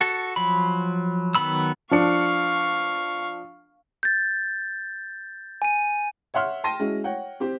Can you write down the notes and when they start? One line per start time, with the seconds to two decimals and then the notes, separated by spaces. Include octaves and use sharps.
0.01 F#4 A4
0.36 F3 F#3 B5
1.35 D#3 F#3 B3 B5 E6
1.91 F3 D4 F5 C#6 C#7
4.03 G6 A6
5.62 G#5 D#7
6.34 C#5 E5 F#5 C6 F6
6.64 G5 A5 C6 A#6 D#7
6.80 G#3 C#4 E4 F#4
7.04 C#5 F#5 G5
7.40 C4 G4 C5